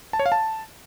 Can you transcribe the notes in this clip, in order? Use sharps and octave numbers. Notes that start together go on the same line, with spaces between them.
A5
C#5
F5
A5